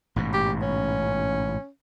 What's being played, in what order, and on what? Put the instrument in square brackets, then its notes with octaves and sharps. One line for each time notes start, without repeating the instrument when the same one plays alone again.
[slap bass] A1 G#2 B2
[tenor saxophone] G4
C#4